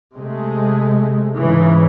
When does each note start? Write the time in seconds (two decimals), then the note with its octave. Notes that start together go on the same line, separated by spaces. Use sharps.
0.15 C3 G#3 A3
1.37 G#2 C#3 E3